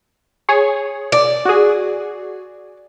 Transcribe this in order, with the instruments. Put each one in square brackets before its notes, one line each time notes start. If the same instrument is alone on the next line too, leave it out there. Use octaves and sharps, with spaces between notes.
[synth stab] G#4 C#5
[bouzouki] D5
[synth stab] F#4 G#4